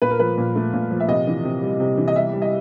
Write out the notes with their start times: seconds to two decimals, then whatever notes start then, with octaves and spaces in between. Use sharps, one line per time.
0.02 A#2 B4
0.11 A#4
0.19 F3 B4
0.38 A#2
0.55 A3
0.74 A#2
0.91 F3
1.00 E5
1.08 C3 D#5
1.27 E3
1.45 C3
1.62 G3
1.80 C3
1.97 E3
2.08 D#5
2.16 G3 E5
2.33 G3
2.42 D#5